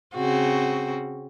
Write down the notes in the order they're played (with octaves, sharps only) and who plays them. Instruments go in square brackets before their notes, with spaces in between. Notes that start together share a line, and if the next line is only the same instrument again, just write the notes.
[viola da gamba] C#3 C4 F#4